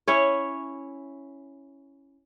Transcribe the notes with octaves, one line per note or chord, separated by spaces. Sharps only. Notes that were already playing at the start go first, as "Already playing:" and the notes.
C#4 E4 C#5